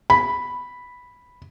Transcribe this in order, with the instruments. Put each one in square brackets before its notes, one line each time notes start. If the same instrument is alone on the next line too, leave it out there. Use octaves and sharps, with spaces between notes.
[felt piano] B5